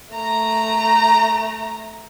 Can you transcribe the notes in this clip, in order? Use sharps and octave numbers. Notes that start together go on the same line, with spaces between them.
A3 A#5